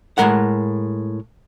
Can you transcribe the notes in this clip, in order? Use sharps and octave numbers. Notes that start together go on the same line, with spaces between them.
A2 G#3 A3 A#4 F#5